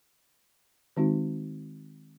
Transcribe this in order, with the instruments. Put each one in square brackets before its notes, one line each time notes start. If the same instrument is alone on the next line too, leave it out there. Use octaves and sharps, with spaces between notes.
[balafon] D#3 G#3 C4 D#4 F#4